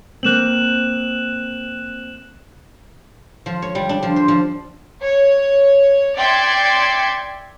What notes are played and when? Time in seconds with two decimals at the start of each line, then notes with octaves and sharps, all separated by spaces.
0.23 A#3 C4 F#6 E7 F#7
3.46 F3
3.62 C#5
3.75 G3
3.89 D4
4.03 F3
4.16 C5
4.28 F3
5.01 C#5
6.16 D5 E5 G5 C6 G#6 C#7